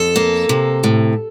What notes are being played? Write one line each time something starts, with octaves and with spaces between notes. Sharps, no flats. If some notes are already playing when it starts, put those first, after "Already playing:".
Already playing: F2 A4
A#3
C3
A2